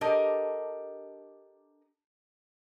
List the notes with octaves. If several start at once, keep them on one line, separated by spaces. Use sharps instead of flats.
D4 G4 A4 A#4 D#5